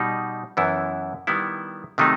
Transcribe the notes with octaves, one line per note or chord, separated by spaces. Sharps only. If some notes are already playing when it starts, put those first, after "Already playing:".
Already playing: B2 G3 D#4
F#2 E3 B3 E4
D#3 G3 B3 E4
C3 D#3 F#3 A3 D#4